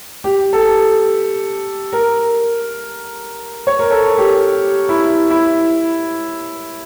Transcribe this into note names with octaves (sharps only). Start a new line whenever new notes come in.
G4
A4
A#4
C#5
A#4
A4
G4
E4
E4